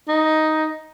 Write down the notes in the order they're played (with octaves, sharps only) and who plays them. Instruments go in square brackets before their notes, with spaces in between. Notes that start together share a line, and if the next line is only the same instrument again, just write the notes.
[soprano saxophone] D#4